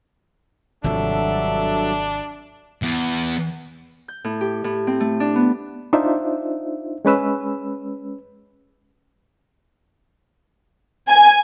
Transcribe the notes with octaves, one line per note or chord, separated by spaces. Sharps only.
G#1 G2 C3 F3 F#3 D4 A4 E5
E2
G6
A2
G4
A2
C4
A3
D4
B3
D4 D#4 F4 C5 E5
G#3 C#4 B4 E6
G#5